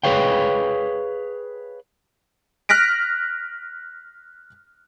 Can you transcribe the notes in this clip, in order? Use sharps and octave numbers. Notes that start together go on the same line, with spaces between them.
G#4 B4 C#5 F5 G5
F6 F#6 A#6 B6 D7